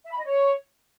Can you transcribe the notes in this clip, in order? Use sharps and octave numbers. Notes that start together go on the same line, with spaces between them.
E5
B5
D#5
C#5